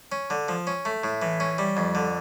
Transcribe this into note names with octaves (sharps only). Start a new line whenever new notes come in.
C#4
D3
F3
C#4
A3
A2
E3
C#4
G3
F2
D3